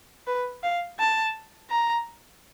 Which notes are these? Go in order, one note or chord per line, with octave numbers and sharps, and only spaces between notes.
B4
F5
A5
A#5